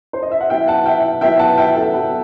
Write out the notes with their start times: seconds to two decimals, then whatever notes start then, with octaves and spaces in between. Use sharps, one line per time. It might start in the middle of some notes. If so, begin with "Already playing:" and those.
0.13 C5
0.22 D#5
0.31 E5
0.40 F#5
0.49 F#3 B3 E4 E5 G5
0.68 F#5 A5
0.86 E5 G5
1.21 F#3 B3 E4 E5 G5
1.39 F#5 A5
1.58 E5 G5
1.75 A4
1.93 F#3 B3 E4 B4